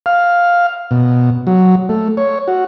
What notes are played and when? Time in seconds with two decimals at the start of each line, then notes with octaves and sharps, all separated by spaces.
0.06 F5
0.91 B2
1.47 F#3
1.89 A3
2.17 C#5
2.48 F#4